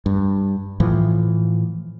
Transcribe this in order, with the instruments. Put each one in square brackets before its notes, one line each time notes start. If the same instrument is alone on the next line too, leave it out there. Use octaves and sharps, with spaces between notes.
[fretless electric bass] G2
A2 E3 F3